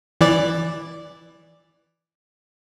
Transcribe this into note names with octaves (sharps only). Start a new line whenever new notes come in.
E3 D5